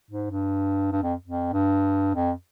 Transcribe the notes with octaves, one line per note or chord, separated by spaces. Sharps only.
G#2
G2
G2
F2
F2
G2
F2